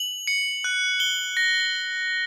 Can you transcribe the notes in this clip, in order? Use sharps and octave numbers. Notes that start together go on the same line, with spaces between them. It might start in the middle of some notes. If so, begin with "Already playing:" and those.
Already playing: F#7
C#7
F#6
G7
A#6